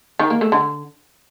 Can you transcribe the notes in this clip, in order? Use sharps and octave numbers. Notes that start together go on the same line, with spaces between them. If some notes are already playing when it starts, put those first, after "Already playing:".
D#3
A#3
A3
D3